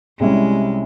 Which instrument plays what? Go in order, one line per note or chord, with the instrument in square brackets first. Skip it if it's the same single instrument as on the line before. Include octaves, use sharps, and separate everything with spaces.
[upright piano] C2 C3 G3 C#4 E4 [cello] G#3